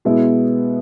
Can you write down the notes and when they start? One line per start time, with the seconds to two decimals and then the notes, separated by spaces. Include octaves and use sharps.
0.05 B2 G#3 B3 E4